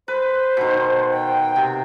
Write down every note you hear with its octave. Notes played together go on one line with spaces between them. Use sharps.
B4 C5
B2 D#3
G5
C3